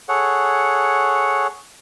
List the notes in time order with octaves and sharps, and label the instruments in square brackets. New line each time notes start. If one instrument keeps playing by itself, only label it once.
[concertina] G#4 A4 C#5 F#5